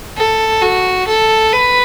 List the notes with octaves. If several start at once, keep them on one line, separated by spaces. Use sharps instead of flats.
A4
F#4
A4
B4